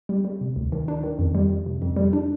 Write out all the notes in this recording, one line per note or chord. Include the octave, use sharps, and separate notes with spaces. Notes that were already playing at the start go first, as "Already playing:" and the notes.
G3
G3
C3
D2
D#3
D4
D#3
F2
G3
F2
C3
F2
G3
D4